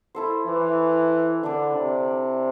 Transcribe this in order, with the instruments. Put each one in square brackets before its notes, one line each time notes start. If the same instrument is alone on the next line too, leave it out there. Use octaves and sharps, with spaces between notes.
[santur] E4 A4 C5
[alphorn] E3
[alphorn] D3 [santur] D4 A4 D5
[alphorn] C3